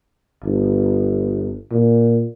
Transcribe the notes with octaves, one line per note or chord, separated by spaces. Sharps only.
G1
A#2